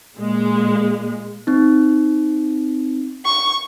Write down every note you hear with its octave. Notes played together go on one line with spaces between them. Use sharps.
A#2 G#3
C4 D#4
C#6